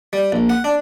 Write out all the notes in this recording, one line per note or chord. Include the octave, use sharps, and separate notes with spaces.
G3
A#1
F#5
D4